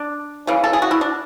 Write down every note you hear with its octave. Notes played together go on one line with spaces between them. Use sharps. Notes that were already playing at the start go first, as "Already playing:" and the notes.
Already playing: D4
C#3 E3 G#3
A4
G#4
F#4
E4
D4